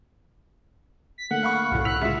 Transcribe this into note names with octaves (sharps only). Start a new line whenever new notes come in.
B6
D3 A3 A#3 F#5
F5 B5 C#6
C2 F#2 A2
E6 F#6 B6 F7
C#3 G#3 F4 E5